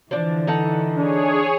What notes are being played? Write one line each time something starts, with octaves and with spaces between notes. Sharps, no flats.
D3 E3 F3 D4
D#4 A4 F#5
D4 G#4 C#5